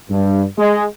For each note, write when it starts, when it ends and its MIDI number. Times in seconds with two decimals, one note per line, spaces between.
0.10 0.43 43
0.58 0.84 56